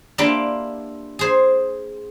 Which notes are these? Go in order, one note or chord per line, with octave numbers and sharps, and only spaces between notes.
A#3 D4 E4 F4 G4 G5
G#4 C5